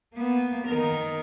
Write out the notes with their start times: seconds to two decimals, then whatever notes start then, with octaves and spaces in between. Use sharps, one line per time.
0.15 A#3 B3
0.68 D#3 A#4